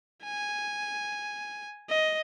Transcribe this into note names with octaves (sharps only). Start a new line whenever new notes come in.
G#5
D#5